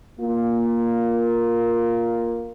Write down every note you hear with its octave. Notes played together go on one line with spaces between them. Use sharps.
A#3 F4